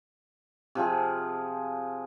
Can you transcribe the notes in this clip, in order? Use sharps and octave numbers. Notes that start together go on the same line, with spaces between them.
C3 F3 F4 G#4